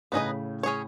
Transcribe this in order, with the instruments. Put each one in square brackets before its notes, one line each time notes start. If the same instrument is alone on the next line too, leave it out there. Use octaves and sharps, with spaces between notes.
[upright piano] A2 C#3 [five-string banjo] B3 D#4 G#4 D#5
[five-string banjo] C#4 G#4 C#5